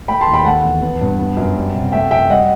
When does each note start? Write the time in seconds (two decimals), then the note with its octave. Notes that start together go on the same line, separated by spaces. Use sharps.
0.08 A3 G5 B5
0.21 A5 C6
0.27 D#2
0.33 G5 B5
0.45 A3 F#5 A5
0.64 E2
0.82 B3
1.01 G2
1.19 B3
1.37 F#2
1.57 G3
1.75 C3
1.92 A3 E5 G5
2.11 F#2 E5 G5
2.30 G3 D#5 F#5